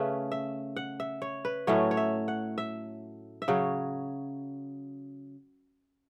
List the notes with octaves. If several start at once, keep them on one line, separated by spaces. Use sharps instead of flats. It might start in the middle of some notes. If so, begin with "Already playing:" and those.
Already playing: C#3 A3 C#4 B4
E5
F#5
E5
C#5
B4
A2 F#3 A3 C#4 C#5
C#5
E5
F#5
E5
E5
C#3 F#3 C#5